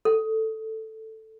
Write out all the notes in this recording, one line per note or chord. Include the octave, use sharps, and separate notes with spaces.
A4